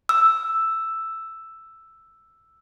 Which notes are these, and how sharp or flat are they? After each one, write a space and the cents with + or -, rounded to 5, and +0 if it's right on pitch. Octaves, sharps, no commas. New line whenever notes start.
E6 +5